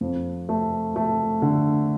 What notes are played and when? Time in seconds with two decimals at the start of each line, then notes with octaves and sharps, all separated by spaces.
0.01 F2
0.49 A3
0.96 A3
1.42 D3